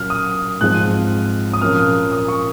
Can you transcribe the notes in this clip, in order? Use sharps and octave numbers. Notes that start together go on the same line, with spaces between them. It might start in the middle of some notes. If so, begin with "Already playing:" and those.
Already playing: A#2 F#3 A#3 C#4 F6
D#6
G#2 F3 G#3 C4 F#6
D#6
A#2 F3 A#3 C#4 F6
D#6
C#6